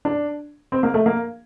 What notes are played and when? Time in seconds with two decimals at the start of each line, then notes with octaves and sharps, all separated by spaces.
0.05 D4
0.72 C4
0.83 A#3
0.94 A3
1.06 A#3